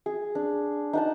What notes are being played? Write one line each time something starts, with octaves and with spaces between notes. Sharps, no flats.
G#4
D4
D#4 F#5 A5